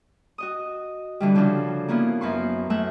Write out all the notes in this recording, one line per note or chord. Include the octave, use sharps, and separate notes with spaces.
F#4 D#5 D#6
D3 E3 G3
C#3 F3 D4 F4 F#4 A4
A#3 B3 C#4 E4 F4
F#2 B3 B4 C6 C#6
F#2 A3 E5 F#5